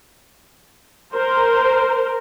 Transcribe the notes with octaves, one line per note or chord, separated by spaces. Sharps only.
A#4 C5